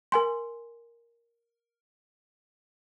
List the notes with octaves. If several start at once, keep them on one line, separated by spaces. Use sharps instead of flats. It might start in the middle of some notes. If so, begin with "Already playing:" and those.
A#4 G#5 C6